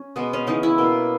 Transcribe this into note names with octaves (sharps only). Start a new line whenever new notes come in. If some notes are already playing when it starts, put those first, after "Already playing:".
Already playing: C#4
B2 G#3 B3
C#4
C#3 E3 G#3 D#4
E4
B2 A#3